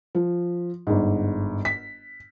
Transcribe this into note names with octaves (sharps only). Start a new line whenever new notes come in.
F3
G1 G#2
B6